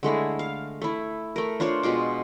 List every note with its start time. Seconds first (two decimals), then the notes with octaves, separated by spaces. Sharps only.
0.03 D3 G#3 A3 E4
0.39 F5
0.82 A3 E4
1.36 A3 A#4
1.60 D4 F4 C5 C#5
1.83 B2 G#3 F4 D6